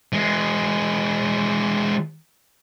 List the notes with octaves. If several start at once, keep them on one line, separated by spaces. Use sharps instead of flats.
E3 G#3